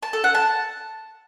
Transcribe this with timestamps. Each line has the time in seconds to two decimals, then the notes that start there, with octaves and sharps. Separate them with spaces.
0.03 A5
0.13 A4
0.24 F#5
0.35 A5